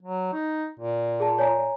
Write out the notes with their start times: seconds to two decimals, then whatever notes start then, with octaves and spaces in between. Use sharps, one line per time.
0.03 F#3
0.33 D#4
0.79 A#2
1.20 G#4 A5
1.38 C#5 G#5 A#5